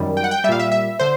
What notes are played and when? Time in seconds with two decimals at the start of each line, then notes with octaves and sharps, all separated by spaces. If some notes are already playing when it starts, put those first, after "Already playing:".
Already playing: F#2 D#3 G3
0.17 G5
0.24 F#5
0.31 G5
0.44 G3 E5
0.49 A#2 F5
0.59 E5
0.72 E5
0.99 D3 C5